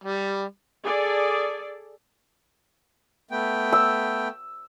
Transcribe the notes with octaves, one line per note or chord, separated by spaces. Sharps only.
G3
G#4 A4 D5
A3 B3 G5
E6